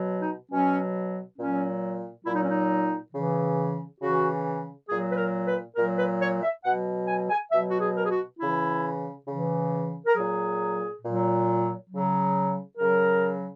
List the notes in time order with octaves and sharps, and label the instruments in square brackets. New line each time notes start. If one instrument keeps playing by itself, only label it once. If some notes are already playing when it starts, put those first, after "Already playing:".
Already playing: [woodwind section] B2 F#3
D#4
B2 F#3 C#4
A#2 F#3 C#4
A#2 F#3 E4
D#4
C#4
D#4
C#3 E3
C#3 E3 F#4
A#2 F#3 G#4
B4
A#4
B4
A#2 F#3 A#4
B4
C#5
E5
B2 F#3 F#5
G#5
G#5
B2 F#3 E5
F#4
G#4
A#4
G#4
F#4
C#3 E3 E4
C#3 E3
A#4
A#2 F#3 G#4
A#2 F#3
C#3 F#3
C#3 F#3 A#4